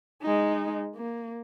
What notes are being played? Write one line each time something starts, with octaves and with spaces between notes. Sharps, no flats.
G#3 D#4
A#3